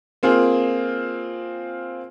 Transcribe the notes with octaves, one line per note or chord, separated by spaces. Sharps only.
A#3 C4 F4 G#4